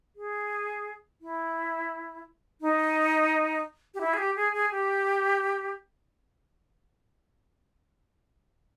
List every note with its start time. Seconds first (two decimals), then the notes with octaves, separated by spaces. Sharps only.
0.16 G#4
1.21 E4
2.61 D#4
3.94 G4
4.01 E4
4.14 G#4
4.18 G4
4.36 G#4
4.53 G#4
4.71 G4